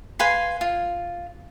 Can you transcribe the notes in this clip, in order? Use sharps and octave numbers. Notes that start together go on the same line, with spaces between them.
B4 F5 G#5 C6
F4